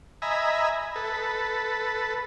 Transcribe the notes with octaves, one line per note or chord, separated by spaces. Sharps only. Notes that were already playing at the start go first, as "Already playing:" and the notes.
D#5 E5 G#5 A#5 B5
A4 B4